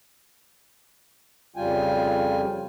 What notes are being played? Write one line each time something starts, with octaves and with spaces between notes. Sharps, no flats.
F2 C#3 G3 F4 G5 G#5